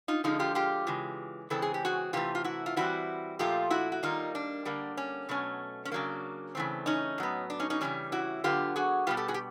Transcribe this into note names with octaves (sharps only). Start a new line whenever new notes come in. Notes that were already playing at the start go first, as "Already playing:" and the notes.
D#4 F4
D3 F3 G#3 D#4 F4
F4 G4
F4 G4
C#3 E3 G#3
C#3 E3 G#3 C4 A4
G#4
G4
F#4 G#4
C3 E3 A3 F4 G4
F4
E4 F#4
F4
E3 G3 C4 E4 F#4
A#2 F3 A3 F4 G4
E4 F#4
F#4
D#3 G3 A#3 D#4 F4
D4
D3 G3 A#3
C#4
B2 F#3 A3 C#4
C#4
C#3 F#3 A#3 D4
C#3 E3 A3 C4
C#4 D#4
A2 F#3 B3
D4
C#4 D#4
C#4 D#4
C#3 E3 G3 C#4
E4 F#4
D3 F#3 B3 F4 G4
F#4 G#4
B2 G3 B3 F4 G4
G4 A4
F#4 G#4
G4